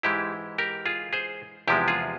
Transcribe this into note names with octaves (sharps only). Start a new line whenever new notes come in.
G#2 E3 G#3 E4 G4
G4 A#4
F4 G#4
G#4 C5
E2 C3 F3 G#3 E4 G4
F4 G#4